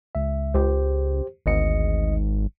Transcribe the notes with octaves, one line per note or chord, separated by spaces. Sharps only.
C#2 E5
C#2 G4 C5
G#1 D2 D#5 C#7